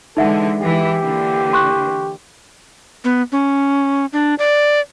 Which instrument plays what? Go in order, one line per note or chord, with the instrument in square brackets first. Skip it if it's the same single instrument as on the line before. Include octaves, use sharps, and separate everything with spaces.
[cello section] D3 E3 G#3 [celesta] D#4 E5 F#5 [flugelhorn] A4
[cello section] E3 G#3 E4 [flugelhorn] G4
[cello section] D3 E3 A#3
[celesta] C6 C#6 F#6
[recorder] B3
C#4
D4
D5